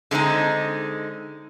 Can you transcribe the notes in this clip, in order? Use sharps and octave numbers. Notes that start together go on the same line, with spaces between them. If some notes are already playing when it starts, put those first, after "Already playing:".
D3 G#3 C4 D#4